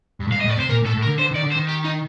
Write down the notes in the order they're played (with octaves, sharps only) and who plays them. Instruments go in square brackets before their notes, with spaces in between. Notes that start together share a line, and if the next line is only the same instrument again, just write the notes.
[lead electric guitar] G2
A2
[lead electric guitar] G2 [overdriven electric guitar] F5
[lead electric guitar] A2 [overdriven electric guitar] D#5
[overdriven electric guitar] D5
[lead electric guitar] C3 [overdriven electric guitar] C5
[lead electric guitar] A#2 [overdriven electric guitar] A#4
[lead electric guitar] A2
[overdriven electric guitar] A4
[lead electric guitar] A2
[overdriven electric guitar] A#4
[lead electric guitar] D3
[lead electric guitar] D3 [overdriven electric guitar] C5
[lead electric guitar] D#3
[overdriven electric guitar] D5
[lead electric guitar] D3
[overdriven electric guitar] C5
[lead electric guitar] D#3
[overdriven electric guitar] G4
D#4